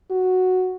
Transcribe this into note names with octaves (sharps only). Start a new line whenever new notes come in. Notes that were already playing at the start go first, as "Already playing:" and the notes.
F#4